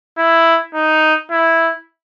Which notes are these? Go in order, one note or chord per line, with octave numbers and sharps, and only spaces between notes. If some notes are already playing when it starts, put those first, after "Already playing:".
E4
D#4
E4